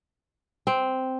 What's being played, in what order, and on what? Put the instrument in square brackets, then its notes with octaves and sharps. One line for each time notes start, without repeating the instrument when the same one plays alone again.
[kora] C4